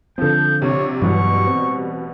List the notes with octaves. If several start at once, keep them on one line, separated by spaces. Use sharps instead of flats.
D3 F3 C4 A4 G6
A#1 C3 C#5
A1 G2 B2 E3 F#3 G3 C#6
C4